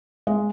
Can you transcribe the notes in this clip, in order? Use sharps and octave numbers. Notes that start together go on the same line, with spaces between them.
G#3